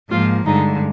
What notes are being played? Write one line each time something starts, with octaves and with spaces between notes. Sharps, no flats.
G#2 F3 A#3 F4
G2 D3 G#3 D#4